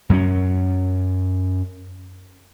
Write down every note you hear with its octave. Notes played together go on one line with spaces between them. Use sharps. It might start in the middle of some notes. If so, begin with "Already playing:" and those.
F#2 F#3 A3 C#4